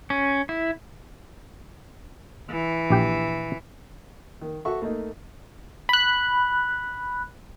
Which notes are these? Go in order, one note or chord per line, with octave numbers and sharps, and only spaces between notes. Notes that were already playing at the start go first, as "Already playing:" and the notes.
C#4
E4
E3
A#1 G4 G5
D#3
F#4 A4 E5 C#6
A3 A#3 D#4
B5 F#6